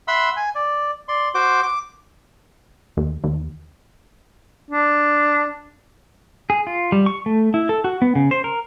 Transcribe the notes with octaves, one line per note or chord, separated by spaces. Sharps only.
E5 F#5 B5 C6 E6
G#5
D5
D5 C6
F#4 C5 D6
D6
D#2
D#2
D4
G#4
F4
G3
C#6
A3
E4
A4
F#4
B3
C#3
C5
A#4